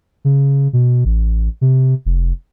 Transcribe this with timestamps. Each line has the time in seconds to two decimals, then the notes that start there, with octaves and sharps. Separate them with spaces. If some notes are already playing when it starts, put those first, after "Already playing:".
0.25 C#3
0.73 B2
1.05 A1
1.61 C3
2.05 F1